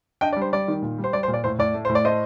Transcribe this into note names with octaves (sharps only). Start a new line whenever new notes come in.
D4 D#5 G5
D5
G3
C5
G3 D5
D#3
A#2
G3
C5
G3 D5
C5
A#2
D5
A2 C5
A2 D5
A3
A2 C5
D5
A3 C5 D#5